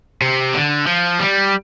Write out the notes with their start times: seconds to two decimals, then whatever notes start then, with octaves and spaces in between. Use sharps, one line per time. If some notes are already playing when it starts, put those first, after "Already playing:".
0.21 C3
0.54 D3
0.87 F3
1.20 G3